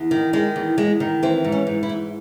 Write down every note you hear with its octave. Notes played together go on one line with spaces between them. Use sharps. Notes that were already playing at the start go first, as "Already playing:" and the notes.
Already playing: E2
D#3
D#3 G#3
E2
E2 G#3
D#3
E3 C4
G#2
C#4
G#2
E4
E3